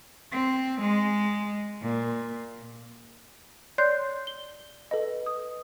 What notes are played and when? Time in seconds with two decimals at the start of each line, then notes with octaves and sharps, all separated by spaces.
0.32 C4
0.81 G#3
1.82 A#2
3.78 C#5 D5 C6 F#6 G6 C7
4.27 G7
4.91 A4 B4 D#5
5.26 D#6